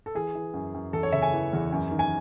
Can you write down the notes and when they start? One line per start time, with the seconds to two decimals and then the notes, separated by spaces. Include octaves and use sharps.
0.06 A4
0.15 E3 G#4
0.35 E3
0.54 F#2
0.74 F#2
0.93 E2 A4
1.03 C#5
1.12 C#3 E5
1.22 G#5
1.33 E3
1.53 E2
1.72 F#2
1.91 D#3
1.99 G#5